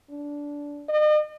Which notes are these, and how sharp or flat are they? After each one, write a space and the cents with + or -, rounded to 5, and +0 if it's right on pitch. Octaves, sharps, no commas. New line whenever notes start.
D4 -15
D#5 -40